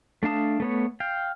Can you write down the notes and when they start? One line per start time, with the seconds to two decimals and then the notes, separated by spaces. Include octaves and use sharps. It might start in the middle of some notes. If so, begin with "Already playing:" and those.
0.23 A3 D4 F5 A5 D#6
0.60 A3 B3 C#5
1.00 F5 G5